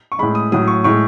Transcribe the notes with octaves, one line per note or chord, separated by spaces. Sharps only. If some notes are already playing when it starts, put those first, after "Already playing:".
C#6
A2 G#3 B5
D#6
A2 F#3 D#6
C#6
A2 G#3 C#6